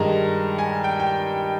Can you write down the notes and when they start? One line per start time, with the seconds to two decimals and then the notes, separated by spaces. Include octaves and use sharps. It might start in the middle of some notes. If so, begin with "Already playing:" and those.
Already playing: G2 D#3 G#3 A#5
0.58 G#5
0.84 G5
1.00 G5